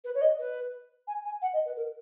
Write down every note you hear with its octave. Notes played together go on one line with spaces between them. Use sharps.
B4
C#5
D#5
B4
G#5
G#5
F#5
D#5
B4
A#4